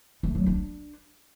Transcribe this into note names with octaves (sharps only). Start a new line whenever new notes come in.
A3
F#3
D4